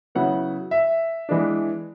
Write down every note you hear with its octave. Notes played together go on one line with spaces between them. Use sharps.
C#3 F#3 B3 E4 F#5
E5
E3 G#3 B3 D4